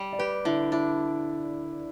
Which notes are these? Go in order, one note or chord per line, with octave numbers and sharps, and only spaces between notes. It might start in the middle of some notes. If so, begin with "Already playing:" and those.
Already playing: G3
D5
G4 B4
D3 E4
D4 E4